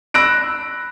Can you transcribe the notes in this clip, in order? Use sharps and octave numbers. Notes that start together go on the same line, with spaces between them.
B5 E6 F#6 A#6 D7